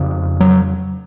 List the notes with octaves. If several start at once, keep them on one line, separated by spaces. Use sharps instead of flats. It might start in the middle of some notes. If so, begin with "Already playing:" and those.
Already playing: F2 C#3
F#3